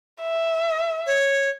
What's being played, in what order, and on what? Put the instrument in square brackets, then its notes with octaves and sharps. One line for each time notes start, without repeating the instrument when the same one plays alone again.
[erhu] E5
[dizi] C#5